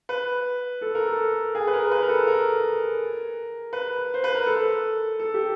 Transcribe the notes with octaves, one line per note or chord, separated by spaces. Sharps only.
B4
A4
A#4
A4
G#4
B4
A#4
A#4
B4
A#4
A4
A#4
B4
C5
B4
A#4
A4
A4
G4